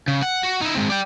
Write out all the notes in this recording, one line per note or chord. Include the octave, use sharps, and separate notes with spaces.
C#3
F#5
F#4
D#4 E4
G#3 C4
D5 G5